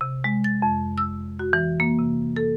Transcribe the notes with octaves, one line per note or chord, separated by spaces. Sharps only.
C3
G#3
A6
F2
E6
F#4
E3
A#3
C3
A4